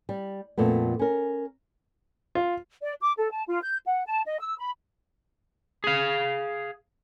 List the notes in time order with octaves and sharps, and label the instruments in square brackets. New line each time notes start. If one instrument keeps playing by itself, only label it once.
[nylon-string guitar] G3
F2 A#2 A3 B3
C#4 A#4
[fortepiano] F4
[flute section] D5
D6
A4
A5
F4
G6
F#5
A5
D#5
E6
B5
[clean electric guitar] G#4 F5